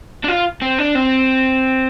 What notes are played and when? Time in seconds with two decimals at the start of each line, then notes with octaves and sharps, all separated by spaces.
0.24 D4
0.28 F4
0.62 C4
0.79 D4
0.95 C4